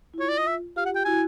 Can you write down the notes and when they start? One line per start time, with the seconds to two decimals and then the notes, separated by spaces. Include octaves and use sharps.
0.14 E4
0.18 F4 C#5
0.29 D5
0.38 D#5
0.47 E5
0.76 F4 G4 F5
0.86 F#5
0.95 G5
1.05 E4 F#4 G#5